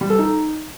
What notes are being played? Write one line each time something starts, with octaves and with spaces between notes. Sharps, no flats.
G3
A4
D#4